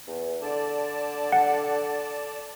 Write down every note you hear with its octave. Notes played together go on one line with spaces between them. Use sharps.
E2
D3 D5 A5
F#5